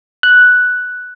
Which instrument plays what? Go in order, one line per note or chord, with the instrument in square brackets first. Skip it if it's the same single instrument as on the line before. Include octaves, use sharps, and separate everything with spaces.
[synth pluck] F#6